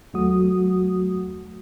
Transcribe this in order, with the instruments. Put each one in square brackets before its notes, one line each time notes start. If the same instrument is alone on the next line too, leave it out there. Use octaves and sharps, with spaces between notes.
[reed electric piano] D#2 F#3 A3 F#4 D#6